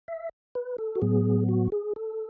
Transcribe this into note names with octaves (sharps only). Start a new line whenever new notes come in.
E5
B4
A4
F#4
A2 F#3 B3 G#4
F#4
G#4
A4